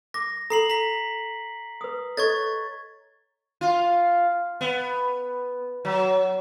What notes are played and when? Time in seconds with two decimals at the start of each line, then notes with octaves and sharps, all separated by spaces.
0.14 D6 A#6
0.50 A4 A#5 B5 C7 F#7
0.70 A#5 B6
1.81 B4 D#6
2.17 A4 C#5 D#5 C#6 G#6 A6
3.61 F4
4.61 B3
5.85 F#3